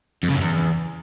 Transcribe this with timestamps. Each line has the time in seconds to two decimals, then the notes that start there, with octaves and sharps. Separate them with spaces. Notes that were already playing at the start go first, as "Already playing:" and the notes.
0.23 F2
0.29 C#3
0.35 F#2
0.41 E2